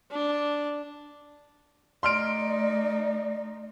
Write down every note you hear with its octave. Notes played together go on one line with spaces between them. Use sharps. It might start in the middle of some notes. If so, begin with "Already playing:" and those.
D4
A3 D#4 D5 C6 F6 D7